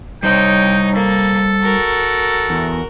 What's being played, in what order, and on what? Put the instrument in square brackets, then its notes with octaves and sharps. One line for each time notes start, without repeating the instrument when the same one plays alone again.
[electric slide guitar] G3 C5 [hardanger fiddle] D#4 C#5 [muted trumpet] G5
[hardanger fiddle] A#3 [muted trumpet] A4
[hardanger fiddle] F#4 A#4
[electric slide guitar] E2